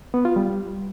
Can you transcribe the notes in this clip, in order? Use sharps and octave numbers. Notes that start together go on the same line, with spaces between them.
B3
F4
G3